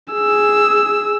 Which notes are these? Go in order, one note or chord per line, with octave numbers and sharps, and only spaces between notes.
G#4 E6